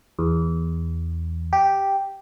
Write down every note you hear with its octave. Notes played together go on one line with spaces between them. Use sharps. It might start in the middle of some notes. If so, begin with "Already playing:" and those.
E2
G4